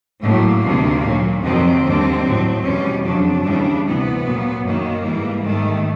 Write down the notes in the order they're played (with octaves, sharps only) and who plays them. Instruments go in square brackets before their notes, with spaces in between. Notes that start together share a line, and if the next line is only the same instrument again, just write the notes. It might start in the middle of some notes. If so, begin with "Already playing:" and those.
[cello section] A2 F#3 A#3
D2 C3 D#3 G3
A#2 F#3
F2 C3 D#3 F#3 C4
D#2 D3 G3
A2 F#3
E2 B2 G3 C#4
F2 C#3 F#3 D4
D#2 C#3 E3 G3
D2 C3 E3 B3
A#2 F#3
F#2 D#3 F#3 A#3
G#2 E3 G3
G#2 D#3 G3 A3